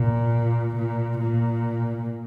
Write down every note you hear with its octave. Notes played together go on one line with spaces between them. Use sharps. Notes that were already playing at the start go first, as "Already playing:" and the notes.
Already playing: A#2
A#2
A#2